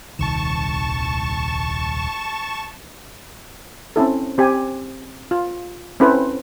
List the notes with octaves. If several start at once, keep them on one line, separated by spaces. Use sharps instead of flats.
D#1 C2 D#3 A5 C#6 E7
C4 C#4 E4 A4
C4 G4 G#5
F4
C4 C#4 E4 A4 B4 C5